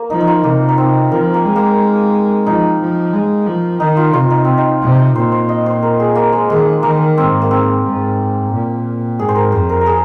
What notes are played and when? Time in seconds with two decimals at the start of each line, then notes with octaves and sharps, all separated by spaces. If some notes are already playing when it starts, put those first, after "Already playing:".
Already playing: A#3
0.10 F3 D#4
0.21 D#4
0.27 F4
0.44 C3 A#3
0.69 D#4
0.78 C4
1.11 F3 A#4
1.34 A#3
1.45 G#3
1.56 A#3
2.45 F3 D#4
2.80 F3
3.13 G#3
3.47 F3
3.80 D#3 D#4
3.97 F4
4.14 C3 F4
4.30 D#4
4.45 C4
4.58 D#4
4.81 C3
5.15 A#2 C5
5.32 C5
5.49 D#5
5.66 C5
5.82 A#4
6.00 G#4
6.15 A#3
6.33 G#3
6.50 D#3 G#3
6.83 D#3 A#3
7.17 G#2 C4
7.42 A#3
7.51 C4
7.84 G#2
8.51 A#2
9.19 G#2 G#4
9.29 C5
9.36 A#4
9.52 F2 C5
9.69 A#4
9.81 A#4
9.86 G#4